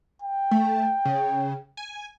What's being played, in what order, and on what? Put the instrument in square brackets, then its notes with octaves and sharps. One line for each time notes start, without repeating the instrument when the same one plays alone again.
[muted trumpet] G5
[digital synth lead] A3
C#3
G#5